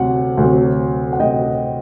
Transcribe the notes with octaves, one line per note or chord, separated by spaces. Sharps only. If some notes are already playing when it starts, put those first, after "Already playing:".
Already playing: D2 C3 F#3 F#5
D2 C3 F#3
F#5
D2 C3 F#3 D#5 G5